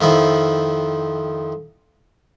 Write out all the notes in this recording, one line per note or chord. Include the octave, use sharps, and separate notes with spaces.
F2 D#3 F3 E4